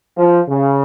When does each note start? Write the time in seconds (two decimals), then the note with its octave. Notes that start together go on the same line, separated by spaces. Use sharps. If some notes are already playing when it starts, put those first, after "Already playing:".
0.17 F3
0.49 C#3